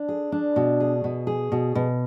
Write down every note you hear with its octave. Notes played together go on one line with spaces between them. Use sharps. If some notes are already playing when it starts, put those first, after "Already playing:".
Already playing: D4
G#4
D4
B2
G#4
B2
G#4
B2
B2